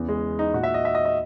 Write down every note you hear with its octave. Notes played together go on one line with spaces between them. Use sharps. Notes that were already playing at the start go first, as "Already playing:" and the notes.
Already playing: E2 C#3 E3
G#3
D#4
A#2 F#4
E5
D#5
E5
D#5
D#5